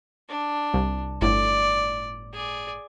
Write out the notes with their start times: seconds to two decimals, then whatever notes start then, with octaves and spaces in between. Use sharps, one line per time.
0.29 D4
0.73 C2
1.21 G1 A2 D5
2.34 G#4 D5